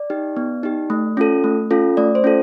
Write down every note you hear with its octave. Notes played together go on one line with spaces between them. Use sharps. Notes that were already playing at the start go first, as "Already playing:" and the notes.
Already playing: D5
D#4 G4
B3
D#4 G4
A3
C#4 F4 A4
A3
C#4 F4 A4
A3 D5
C5
C#4 F4 A4